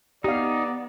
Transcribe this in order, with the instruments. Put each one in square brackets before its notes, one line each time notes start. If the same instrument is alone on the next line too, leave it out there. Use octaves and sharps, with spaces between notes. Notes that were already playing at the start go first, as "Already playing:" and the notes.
[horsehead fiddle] B3 [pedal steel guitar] D#4 [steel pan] G4 F5 [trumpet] D5